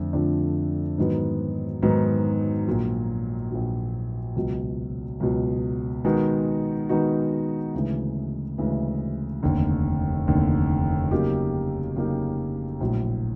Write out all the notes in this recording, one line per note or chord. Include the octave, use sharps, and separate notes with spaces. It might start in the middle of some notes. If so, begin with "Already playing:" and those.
Already playing: F2 D3 F3 A3 D4
F2 D3 F3 A3 D4
G#2 D#3 F#3 B3
G#2 D#3 F#3 B3
A#1 A#2 F#3
A#1 A#2 F#3
C#2 B2 F#3
C#2 B2 F#3
D#3 G#3 B3 D#4 F#4
D#3 G#3 B3 D#4 F#4
D2 C#3 E3 G#3
D2 C#3 E3 G#3
F1 D#2 D3
F1 D#2 D3
C#3 F#3 A#3 D#4 G4
C#3 F#3 A#3 D#4 G4
A#1 A2 F#3